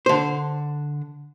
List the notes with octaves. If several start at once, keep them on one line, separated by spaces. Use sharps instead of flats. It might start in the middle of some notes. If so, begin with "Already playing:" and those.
D3 C5